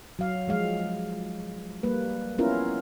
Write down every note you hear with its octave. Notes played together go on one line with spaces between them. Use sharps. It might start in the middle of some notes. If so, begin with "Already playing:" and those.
F#3 F5
F3 G#3 F5
G3 A#3 B4
B3 C#4 E4 F4 A#4